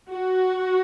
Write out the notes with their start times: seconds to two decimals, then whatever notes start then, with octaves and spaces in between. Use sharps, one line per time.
0.10 F#4